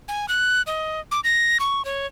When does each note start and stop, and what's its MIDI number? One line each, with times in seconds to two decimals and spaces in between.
0.08 0.26 80
0.29 0.62 90
0.67 1.00 75
1.11 1.20 86
1.24 1.58 94
1.60 1.85 85
1.85 2.07 73